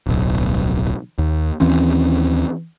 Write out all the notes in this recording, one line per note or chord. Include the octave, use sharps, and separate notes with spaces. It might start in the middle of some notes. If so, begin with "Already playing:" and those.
D1 B1
D#2
D#2 E3 C4 C#4